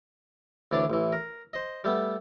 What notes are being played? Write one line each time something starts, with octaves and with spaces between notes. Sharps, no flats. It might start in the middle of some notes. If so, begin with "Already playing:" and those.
D2 E3 D4 C#5 D5
A1 E3
A#4
C5 D#5
G3 A3 B3